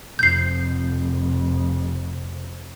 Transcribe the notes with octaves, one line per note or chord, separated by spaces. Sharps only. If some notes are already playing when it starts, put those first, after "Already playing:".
F1 F2 G6 C7